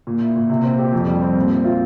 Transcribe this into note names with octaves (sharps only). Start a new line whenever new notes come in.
A#2
E4
A#2
C3
C4
G4
F2
G3
C4
A#2
C4
F4